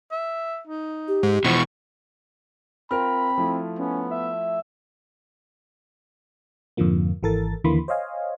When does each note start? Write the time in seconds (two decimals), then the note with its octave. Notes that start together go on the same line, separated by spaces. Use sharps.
0.11 E5
0.67 D#4
1.08 G4
1.23 G#2
1.45 B2 E3 F3 C#6
2.91 C4 F4 A#4 B5 F6
3.38 F3 A3 E4
3.79 B3 C#4
4.11 E5
6.77 F2 G#2 D3 F3 A#3
7.23 G#1 E3 A4 A#4 A6
7.64 D#2 D3 E3 A#3 B5 C6
7.88 C5 C#5 D#5 F5 G#5